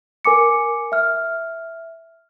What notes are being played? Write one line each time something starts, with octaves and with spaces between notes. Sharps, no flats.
A#4 G#5 D6 C#7
E5 F6